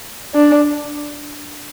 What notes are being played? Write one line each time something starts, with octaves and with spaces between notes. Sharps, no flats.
D4